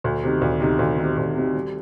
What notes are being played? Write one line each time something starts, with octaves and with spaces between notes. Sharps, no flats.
D2
C3 D#3
D2
C3 D#3
D2
C3 D#3
D2
C3 D#3
G3